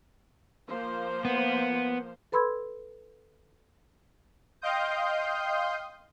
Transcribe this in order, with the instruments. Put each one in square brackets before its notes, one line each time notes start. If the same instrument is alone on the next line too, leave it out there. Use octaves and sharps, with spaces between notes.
[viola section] F3 A#3 C5
[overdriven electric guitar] B3
[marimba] A4 B4 B5 C6 E6 G#6
[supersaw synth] D#5 F5 G5 C6 D#6 G6